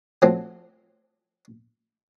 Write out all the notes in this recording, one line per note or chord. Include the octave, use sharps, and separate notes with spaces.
F3 F#3 A3 C4